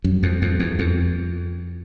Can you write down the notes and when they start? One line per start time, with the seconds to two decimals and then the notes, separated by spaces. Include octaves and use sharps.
0.04 F#2
0.23 F2
0.42 F2
0.60 E2
0.79 F2